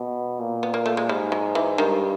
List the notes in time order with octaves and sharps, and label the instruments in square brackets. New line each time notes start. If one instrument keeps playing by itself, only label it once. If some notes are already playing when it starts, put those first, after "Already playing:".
Already playing: [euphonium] B2
A#2
[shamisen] B3
A#3
A3
G#3
[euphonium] G#2 [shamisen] G3
[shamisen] F#3
E3
[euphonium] G2 [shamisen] D#3